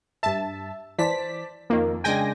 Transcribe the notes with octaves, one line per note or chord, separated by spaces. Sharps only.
G2 E5 A5
E3 C5 D5 A5 B6
F2 D#3 A#3
C#3 G#3 D4 G5 G#5 A#6